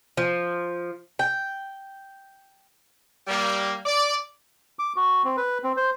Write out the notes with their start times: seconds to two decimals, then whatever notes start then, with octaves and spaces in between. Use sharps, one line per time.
0.17 F3
1.19 G5
3.27 G3 A#3
3.86 D5
4.79 D6
4.96 F#4
5.25 C4
5.37 B4
5.64 C4
5.77 C5